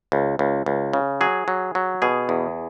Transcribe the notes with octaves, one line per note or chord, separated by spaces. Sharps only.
C#2
C#2
C#2
C#3
F#3 G#4
F#3
F#3
B2 G#4
E2